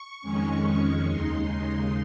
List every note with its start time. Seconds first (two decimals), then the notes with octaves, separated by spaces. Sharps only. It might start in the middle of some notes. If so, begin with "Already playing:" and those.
Already playing: C#6
0.21 F2 D#3 G#3 C#4
1.07 D#2 C#3 G#3 D#4 C6